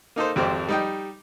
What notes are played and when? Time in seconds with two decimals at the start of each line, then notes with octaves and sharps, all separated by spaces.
0.16 A#3 D#4 A4 C5
0.36 G#1 F2 G4 C5 D5
0.69 G3 D#4 G5